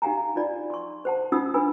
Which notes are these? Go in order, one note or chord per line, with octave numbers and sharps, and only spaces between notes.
D#4 G4 F5 F#5 G#5 A#5
D#4 F4 D5
C6 C#6
C5 F#5 A5
C#4 D#4 F4 F#5 D#6 E6
D4 B4 G#5 B5 E6